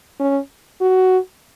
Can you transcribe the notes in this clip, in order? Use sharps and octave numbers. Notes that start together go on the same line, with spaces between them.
C#4
F#4